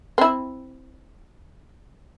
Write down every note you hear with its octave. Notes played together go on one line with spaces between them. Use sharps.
C4 E4